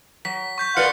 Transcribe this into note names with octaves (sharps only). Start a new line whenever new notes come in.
F#3 B6
C#6 G6 B6
A#4 B4 D5 F5 F#5 C6 C#7